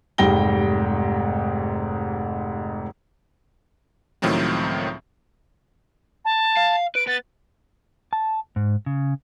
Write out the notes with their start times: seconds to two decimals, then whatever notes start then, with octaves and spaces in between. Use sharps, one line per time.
0.18 F1 G#2 G3 G5 A#6 G7
4.22 C#2 A2 D#3 F3 F#3 C4
6.25 A5
6.57 F5
6.95 B4 D7
7.07 B3 A6
8.13 A5
8.56 G#2
8.86 C#3